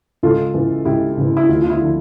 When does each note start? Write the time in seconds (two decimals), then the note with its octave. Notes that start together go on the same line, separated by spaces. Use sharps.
0.23 C#2 F4 A4
0.54 C#3 E3
0.85 C#2 E4 G4
1.17 C#3 E3
1.37 E4
1.49 D2 F4
1.62 F4
1.70 E4
1.80 D3 F3